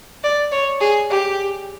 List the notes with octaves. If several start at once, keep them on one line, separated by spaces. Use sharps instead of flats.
D5
C#5
G#4
G4